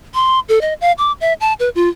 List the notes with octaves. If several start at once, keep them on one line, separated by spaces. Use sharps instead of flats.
C6
A4
D#5
F5
D6
E5
A5
B4
F4